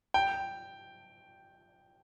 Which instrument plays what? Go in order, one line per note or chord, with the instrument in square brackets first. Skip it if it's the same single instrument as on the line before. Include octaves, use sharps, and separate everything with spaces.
[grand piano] G5